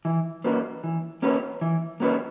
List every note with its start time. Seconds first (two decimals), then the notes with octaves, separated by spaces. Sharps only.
0.05 E3
0.44 A#3 C#4 F#4 B4
0.84 E3
1.22 A#3 C#4 F#4 B4
1.61 E3
2.00 A#3 C#4 F#4 B4